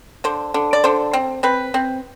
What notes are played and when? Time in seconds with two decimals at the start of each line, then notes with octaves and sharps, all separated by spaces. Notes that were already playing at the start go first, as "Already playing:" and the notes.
0.24 D3 C5
0.54 D3
0.73 D5
0.84 D3 C5
1.13 C4
1.43 C4 B4
1.74 C4